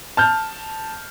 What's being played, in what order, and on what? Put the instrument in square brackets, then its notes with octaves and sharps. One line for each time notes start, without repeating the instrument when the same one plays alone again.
[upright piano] A5 F6 G6